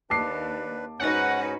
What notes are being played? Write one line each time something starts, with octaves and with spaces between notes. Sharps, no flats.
D#2 D4 B4 A5 D6 C7
G#2 C#4 D#4 F#4 B4 F#5